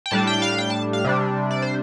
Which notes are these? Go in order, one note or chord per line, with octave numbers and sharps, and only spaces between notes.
G5
A2 G3 D4 A5
G5
F5
G5
A5
F5
C3 G3 D4
D5
C5